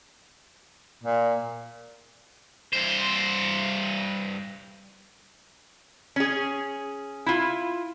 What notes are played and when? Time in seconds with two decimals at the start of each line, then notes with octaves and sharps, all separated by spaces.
1.03 A#2
2.73 G2 C5
6.16 C#4 G#4
7.26 E4 F4